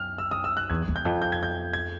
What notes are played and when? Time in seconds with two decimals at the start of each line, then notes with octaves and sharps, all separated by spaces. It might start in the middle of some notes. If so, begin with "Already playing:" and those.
Already playing: F#2 F6
0.18 E6
0.31 D#6
0.44 E6
0.57 F#6
0.70 E2 G#6
0.88 E2
0.96 G6
1.05 F2
1.22 G6
1.32 G#6
1.43 G6
1.73 G#6